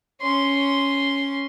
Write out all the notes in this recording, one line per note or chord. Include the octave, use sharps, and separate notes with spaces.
C#4 C6